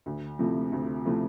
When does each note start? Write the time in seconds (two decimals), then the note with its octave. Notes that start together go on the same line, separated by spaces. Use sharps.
0.06 D2
0.39 C3 F3 A3 E4
0.72 D2
1.05 C3 F3 A3 E4